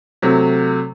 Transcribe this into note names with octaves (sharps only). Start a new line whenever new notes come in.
C3 F#3 A3